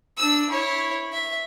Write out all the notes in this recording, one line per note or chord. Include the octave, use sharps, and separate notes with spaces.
D4 E6
E4 C#5
E5